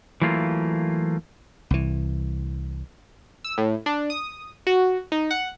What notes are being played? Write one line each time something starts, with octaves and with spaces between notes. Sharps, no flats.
E3 F#3 A3 A#3 F4
C2 E3
E6
A2
D4
D#6
F#4
D#4
F#5